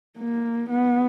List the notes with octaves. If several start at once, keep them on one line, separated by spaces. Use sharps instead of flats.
A#3
B3